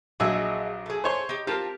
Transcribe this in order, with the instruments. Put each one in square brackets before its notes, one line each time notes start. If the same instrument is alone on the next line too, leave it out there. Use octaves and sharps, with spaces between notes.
[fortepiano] A#1 F#3 E6 [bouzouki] G#4 D#5 E5
[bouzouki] A3 G#4
[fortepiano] C5 C#5 C6
[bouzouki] D#4 G4
[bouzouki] C4 F4 A5 [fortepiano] G4 A#4